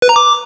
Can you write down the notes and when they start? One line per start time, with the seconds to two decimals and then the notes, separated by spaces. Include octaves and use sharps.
0.02 B4
0.09 A#5
0.16 D6